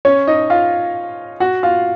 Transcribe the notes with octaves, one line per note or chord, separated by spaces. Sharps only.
C#4 C#5
D#4 D#5
F4 F5
F#4 F#5
F4 F5